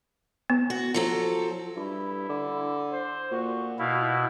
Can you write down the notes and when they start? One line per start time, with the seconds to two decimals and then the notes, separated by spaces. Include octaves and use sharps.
0.50 B3
0.70 F#4
0.94 F3 F#3 A4
1.76 G2 E4
2.29 D3
2.91 C5
3.31 A#2 F#4
3.79 B2 E4 F5